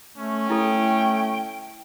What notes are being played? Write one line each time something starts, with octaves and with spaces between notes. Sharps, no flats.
A3 C#4
A3 E4 A4 G5